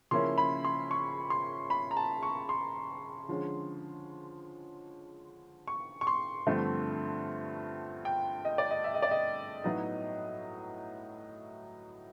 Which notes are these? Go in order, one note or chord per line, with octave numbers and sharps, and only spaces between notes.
C#3 F3 A#3 C#4 E4 C6
B5
C6
C#6
C6
B5
A#5
A5
C#6
C6
D3 F3 G#3 C#4
C#6
C#6
C6
G2 D3 F3 A3 C4
G5
D#5
D5
D#5
E5
D#5
D5
D#5
A2 F#3 B3 D#4